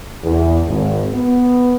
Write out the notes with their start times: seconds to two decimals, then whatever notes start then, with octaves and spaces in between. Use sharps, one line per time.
0.23 E2
0.68 G#1
1.14 B3